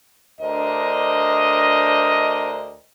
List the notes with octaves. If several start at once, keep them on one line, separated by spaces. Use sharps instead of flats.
D2 D4 A#4 C5 D#5